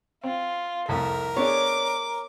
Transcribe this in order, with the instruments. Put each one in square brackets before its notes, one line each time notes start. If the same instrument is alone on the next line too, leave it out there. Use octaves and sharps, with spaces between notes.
[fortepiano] C4 [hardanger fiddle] F4
[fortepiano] C2 F2 A3 [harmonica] A#4 [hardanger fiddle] E5
[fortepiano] B3 D4 G#4 [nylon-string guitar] C#5 [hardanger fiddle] D6